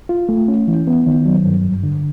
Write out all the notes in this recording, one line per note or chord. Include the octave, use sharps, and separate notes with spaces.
F4
A3
C#4
E3
B3
D#3
F#3
G2
F#2
D3